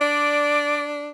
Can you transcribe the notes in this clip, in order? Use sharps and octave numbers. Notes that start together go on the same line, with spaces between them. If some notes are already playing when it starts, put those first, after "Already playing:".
D4 D5